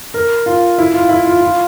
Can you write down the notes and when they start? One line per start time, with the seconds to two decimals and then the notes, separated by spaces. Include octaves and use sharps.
0.14 A#4
0.46 F4
0.78 E4
0.94 F4
1.09 E4
1.25 F4
1.41 F4